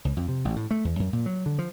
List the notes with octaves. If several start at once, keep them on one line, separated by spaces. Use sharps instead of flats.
C#2
F2
C3
A1
A2
A3
E2
F#2
A#2
F#3
D3
F3